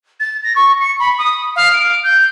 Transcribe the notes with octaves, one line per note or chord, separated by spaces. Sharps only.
A6
A#6
C#6
C#7
B5
D#6
F5
D7
G6